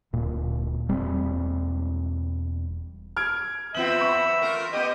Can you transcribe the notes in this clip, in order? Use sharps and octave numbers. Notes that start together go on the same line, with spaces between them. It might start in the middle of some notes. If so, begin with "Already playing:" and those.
D1 A#2
E1 G3 C4
F6 G#6 D7
E3 B3 C4 F4 E5 F#7
B5 C#6
A3 F4 A#4
B3 G4 D#5